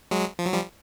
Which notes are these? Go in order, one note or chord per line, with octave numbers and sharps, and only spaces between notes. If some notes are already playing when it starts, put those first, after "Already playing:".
F#3 G#3
F3
F#3
F3 G3